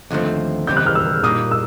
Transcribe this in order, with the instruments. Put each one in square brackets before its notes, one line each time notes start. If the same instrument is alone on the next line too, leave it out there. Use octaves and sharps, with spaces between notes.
[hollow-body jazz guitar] D#2 D3 F3 A3 C4
[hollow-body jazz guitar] D#2 C#3 E3 G3 C4 [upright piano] G6
[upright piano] F#6
F6
E6
[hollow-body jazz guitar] A#2 G3 A#3 D#4 [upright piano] D#6
[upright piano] E6